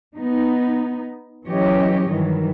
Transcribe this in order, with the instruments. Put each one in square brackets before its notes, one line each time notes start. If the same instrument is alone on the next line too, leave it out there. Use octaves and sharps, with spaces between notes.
[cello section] B3 D#4
E3 F#3 C#4 G4 C#5 D#5
G2 D#3 E3 F#3